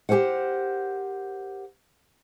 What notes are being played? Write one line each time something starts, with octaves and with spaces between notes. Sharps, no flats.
G4 G#4 A#4 C5 F#5